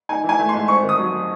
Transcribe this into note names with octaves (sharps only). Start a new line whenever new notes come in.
D#4 G#5
E3
G#5
A3
C6
G#2
C4 C#6
D#3
D#6
F#3